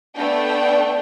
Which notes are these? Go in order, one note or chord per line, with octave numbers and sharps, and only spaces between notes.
A3 B3 D4 G5